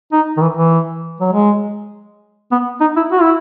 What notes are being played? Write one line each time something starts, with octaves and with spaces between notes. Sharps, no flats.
D#4
D#3
E3
E3
F#3
G#3
B3
D#4
E4
F#4
E4